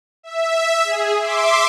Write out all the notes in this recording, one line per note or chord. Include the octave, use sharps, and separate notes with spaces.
E5
G#4
E5 C6 D6